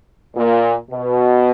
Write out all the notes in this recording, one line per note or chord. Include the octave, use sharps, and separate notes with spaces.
A#2
B2